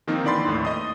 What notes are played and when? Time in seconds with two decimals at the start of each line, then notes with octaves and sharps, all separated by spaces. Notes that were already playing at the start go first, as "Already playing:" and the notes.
0.08 D#3 F3 A#3 C4 D#4 F4
0.24 D3 E3 D5 B5 C6 A6
0.47 D#2 A2 A3
0.65 D#5 D#6